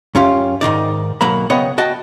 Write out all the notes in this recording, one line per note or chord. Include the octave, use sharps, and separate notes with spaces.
F#2 C#4 F4 G4
G#2 D#3 D#4 D5
B1 F#3 A#3 A#5 B5
C#3 B3 C#5 D#5 F#5 G5
F#4 D#5 G5 A5